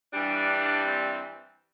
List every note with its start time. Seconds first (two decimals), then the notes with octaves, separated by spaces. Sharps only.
0.13 G2 E3 G3 D4
0.84 C4